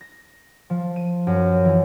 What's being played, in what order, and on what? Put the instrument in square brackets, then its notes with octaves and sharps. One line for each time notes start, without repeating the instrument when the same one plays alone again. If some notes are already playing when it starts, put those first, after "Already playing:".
[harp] A#6
F3
D#7
F#2
E3